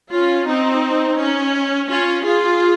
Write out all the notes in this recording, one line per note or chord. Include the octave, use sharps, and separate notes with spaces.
C#4 F4
C4 D#4
C#4
C#4 F4
F4 G#4